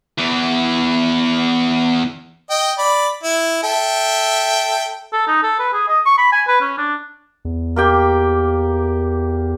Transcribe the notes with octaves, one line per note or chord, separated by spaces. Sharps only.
E2 E3
D#5 G5
D5 B5
E4
A4 E5 G5
A4
D#4
A4
B4
G#4
D#5
C#6
B5
G#5
B4
C#4
D4
E2
A#3 G4 G5